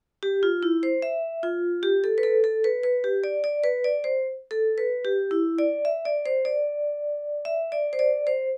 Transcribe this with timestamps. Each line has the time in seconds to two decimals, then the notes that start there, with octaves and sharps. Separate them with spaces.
0.23 G4
0.43 F4
0.63 E4
0.83 C5
1.02 E5
1.43 F4
1.83 G4
2.04 A4
2.18 B4
2.23 A4
2.44 A4
2.64 B4
2.83 B4
3.04 G4
3.24 D5
3.44 D5
3.64 B4
3.84 D5
4.04 C5
4.51 A4
4.78 B4
5.05 G4
5.31 E4
5.58 D5
5.85 E5
6.05 D5
6.26 C5
6.45 D5
7.45 E5
7.72 D5
7.93 C5
7.99 D5
8.27 C5